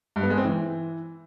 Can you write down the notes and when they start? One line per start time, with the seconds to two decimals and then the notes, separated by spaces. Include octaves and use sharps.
0.16 G2
0.23 B3
0.30 G#3
0.37 C4
0.45 E3